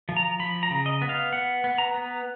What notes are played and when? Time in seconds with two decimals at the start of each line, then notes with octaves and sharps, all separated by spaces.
0.09 F3
0.17 A#5
0.39 F3 B5
0.63 A#5
0.71 C#3
0.86 D#5
1.02 B3
1.09 F5
1.33 B3 F#5
1.64 B3
1.78 A#5
1.94 B3